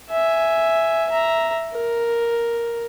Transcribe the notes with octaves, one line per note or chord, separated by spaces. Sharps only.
E5 G#5
E5 A#5
A#4